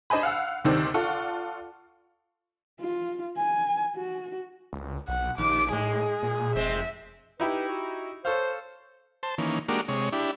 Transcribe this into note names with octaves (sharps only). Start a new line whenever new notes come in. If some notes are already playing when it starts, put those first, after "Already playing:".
D4 C5 D#5 G#5 B5
F5 F#5 E6
D2 C3 D#3 C4 D4
F4 A4 D5 F#5 C#6
F4
G#5
F#4
C#2
B1 F#5
A#1 D#2 D6
A2 G#3 G#4
A#2
F1 G#3 C4 E5
D#4 E4 G4 B4
F#4
A4 C5 C#5 F5
C5 A5
D#3 E3 A#3 C#4
G#3 A#3 D4 F#4 G4 A#4
C3 G#3 C#5
D4 E4 G4